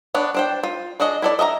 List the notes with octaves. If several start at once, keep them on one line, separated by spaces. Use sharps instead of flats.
B3 D4 C#5
D4 C5 G5
F4
D4 F#4 G#4 D#5
E4 A4 D5
D#5 E5 A5 A#5